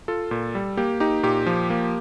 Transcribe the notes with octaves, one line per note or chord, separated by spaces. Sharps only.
F4 A4
A#2
G3
A#3 G4
D#4 G4
A#2 G4
F3
A#3